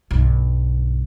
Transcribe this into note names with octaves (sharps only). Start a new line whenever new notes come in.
B1 G2